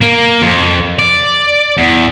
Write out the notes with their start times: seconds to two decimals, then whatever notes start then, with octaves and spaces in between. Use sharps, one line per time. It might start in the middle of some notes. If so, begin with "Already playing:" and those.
0.01 A#3
0.42 F2
0.99 D5
1.78 E2